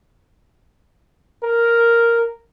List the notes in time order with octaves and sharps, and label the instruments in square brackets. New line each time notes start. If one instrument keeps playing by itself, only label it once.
[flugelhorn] A#4